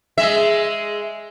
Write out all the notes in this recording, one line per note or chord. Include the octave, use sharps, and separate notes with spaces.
G#3 E5